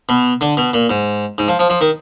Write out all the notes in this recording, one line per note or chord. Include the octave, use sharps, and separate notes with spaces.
B2
D3
B2
A#2
G#2
G#2
F3
F3
F3
D#3